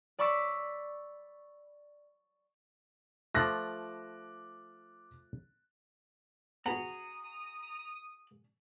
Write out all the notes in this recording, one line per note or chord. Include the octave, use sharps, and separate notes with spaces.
D5 B5 C#6 D6 E6 B6
F3 A3 D6 F#6 A#6
B3 F#4 G#4 F#5 A#5 D#6